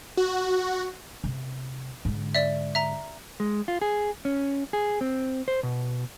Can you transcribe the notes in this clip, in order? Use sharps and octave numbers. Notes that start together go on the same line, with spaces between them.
F#4
C3
G#2 D3
D5 E5
E5 A#5
G#3
F4
G#4
C#4
G#4
C4
C5
B2